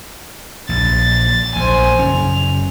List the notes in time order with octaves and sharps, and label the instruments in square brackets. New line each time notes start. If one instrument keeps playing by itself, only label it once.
[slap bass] A#1 [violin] A6
[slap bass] A#1 [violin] C5 G#5
[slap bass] F#1 C#4 [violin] F7